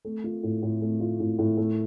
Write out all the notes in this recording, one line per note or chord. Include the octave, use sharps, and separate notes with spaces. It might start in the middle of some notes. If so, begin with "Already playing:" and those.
A3
F4
A2
A2
A3
F4
A2
A2
A3